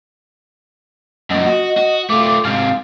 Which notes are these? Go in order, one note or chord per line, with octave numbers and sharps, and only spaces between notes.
F#2 A#2 D#5
F#4
F#4
A3 F4 D6
G#2 C3 F5